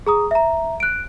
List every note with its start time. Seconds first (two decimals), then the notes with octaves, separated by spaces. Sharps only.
0.07 G#4 A#5 D#6
0.31 E5 A#5
0.80 F#6 D7